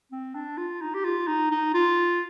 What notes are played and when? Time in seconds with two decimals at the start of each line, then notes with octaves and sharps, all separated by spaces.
0.12 C4
0.35 D4
0.57 F4
0.82 D#4
0.94 G4
1.04 F4
1.27 D#4
1.51 D#4
1.74 F4